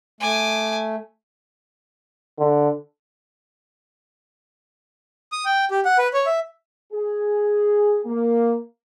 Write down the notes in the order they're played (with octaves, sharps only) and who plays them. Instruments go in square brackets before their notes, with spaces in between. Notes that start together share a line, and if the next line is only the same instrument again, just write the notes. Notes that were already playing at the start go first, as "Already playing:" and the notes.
[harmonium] A3 [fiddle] G#5 D6
[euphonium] D3
[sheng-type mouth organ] D#6
G5
G4
F#5
B4
C#5
E5
[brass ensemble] G#4
A#3